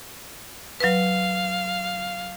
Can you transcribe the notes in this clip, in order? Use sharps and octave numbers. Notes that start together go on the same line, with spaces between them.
F#3 B4 F5